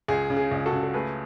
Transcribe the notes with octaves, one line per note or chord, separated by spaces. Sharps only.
C#2 G#4
C#3
G#4
C#2
F#4 A4
C#3
A4
A3 G#4 B4